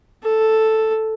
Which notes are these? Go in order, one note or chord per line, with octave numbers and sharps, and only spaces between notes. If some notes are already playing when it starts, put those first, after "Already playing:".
A4